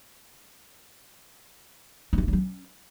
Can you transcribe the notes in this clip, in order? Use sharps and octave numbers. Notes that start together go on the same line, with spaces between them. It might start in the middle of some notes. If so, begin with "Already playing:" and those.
C#4
E3
A#3
F#3
C#4